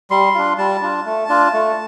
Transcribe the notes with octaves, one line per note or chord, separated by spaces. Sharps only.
G3 C6
D4 F4
G3 A5
D4 F4
A3
D4 F4
A3